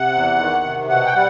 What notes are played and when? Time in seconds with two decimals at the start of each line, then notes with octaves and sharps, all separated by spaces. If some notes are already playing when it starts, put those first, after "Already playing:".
Already playing: C3 F#5
0.13 E2
0.39 D#3
0.64 C3
0.89 B2 F#5
1.06 G5
1.14 G3 F#5